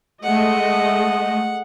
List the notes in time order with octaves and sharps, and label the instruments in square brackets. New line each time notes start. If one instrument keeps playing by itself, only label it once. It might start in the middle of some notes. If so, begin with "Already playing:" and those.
[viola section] G#3 A3 D#5 [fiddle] F#5